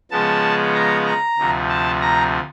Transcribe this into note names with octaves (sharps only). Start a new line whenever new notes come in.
C#3 F3 G#3 B3 A5
A#5
A#5
D2 C3 F3
A5
A#5